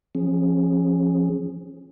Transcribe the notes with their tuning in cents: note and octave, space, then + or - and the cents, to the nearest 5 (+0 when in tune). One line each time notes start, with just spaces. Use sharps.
F3 -15 C#4 -30 G#4 +0